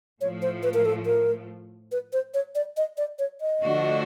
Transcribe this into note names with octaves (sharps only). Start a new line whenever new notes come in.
A2 F3 A3 C#5
C5
B4
A#4
A4
A#4
B4
C5
C#5
D5
D#5
D5
C#5
D#5
D3 F3 A3 D4 F#4